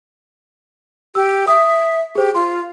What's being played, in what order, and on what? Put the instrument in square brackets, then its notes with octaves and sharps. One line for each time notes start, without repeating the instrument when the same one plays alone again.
[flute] G4 [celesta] E6
[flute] E5 [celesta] D#6
[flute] G4 [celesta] G#4 C5
[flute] F4 [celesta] C6